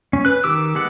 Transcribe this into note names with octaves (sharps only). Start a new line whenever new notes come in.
C#4
B4 F#6
D#3 G4 D6 E6
G#3 B3 F#5 D6